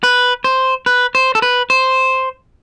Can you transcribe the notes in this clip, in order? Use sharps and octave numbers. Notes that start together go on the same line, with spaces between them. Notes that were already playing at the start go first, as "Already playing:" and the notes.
B4
C5
B4
C5
A4
B4
C5